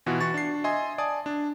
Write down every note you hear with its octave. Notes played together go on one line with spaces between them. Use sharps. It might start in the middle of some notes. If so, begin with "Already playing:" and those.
B2 E3 F4 F#4
E3 F#4 C#6 A6
D4 C7
D#5 E5 G#5 C6
D5 G#5 A5 D#6
D4